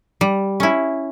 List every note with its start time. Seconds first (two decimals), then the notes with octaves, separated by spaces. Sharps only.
0.21 G3
0.60 C#4 E4